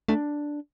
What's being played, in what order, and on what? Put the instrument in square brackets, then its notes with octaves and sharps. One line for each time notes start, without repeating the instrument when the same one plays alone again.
[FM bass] A3 [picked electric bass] D4